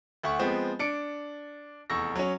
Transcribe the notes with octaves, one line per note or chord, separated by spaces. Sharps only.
D2 E5 F#5 C#6
F3 G#3 B3 C4
D4 C#7 D7
F1 E2 C#6 E6 A#6
F#3 C#4